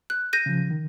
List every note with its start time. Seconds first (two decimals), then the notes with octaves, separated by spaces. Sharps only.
0.10 F#6
0.33 G6 A#6 D#7
0.46 C#3 F3
0.70 D#3